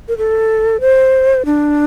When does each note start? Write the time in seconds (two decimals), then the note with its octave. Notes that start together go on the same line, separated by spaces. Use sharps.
0.08 A#4
0.18 A4
0.81 C5
1.45 D4